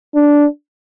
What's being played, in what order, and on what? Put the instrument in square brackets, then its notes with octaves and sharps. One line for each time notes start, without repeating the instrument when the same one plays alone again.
[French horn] D4